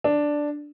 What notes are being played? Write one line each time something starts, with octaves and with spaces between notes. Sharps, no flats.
D4